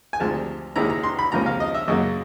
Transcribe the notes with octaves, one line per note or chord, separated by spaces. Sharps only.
G#5
D2 C3 F3 G#3 A5
D#2 D#3 G#3 C#4 E4 A#5
A#5
C6
B5
C#2 C3 F3 A#3 C#4 A#5
F5
D#5
E5
F#2 C#3 F#3 A#3 D#5